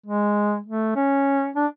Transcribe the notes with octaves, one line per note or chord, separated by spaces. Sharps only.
G#3
A3
C#4
D4